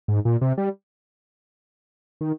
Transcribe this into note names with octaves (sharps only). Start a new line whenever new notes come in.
G#2
A#2
C3
G3
D#3